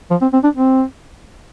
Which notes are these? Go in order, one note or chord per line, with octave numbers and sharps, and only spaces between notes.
F3
C4
C4
D4
C4